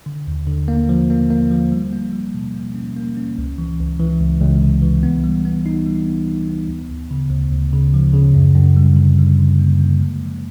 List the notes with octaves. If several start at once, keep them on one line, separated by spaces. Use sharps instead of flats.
D3
D#2
D3
A#3
F3
A#3
A#3
F3
G3
A#3
G3
B2
A#3
C#4
A#3
C#4
C#2
E3
C#2
E3
C#2
C#2
C3
E3
B3
G3
B3
D#4
G3
B3
D#4
B3
D2
D2
C#3
D2
D2
C#3
F3
C#3
F#2
F#2
G3
D3
G3
D3
A#3
A#3
G#3
F3